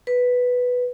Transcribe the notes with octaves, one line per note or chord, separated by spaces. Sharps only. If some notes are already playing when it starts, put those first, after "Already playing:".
B4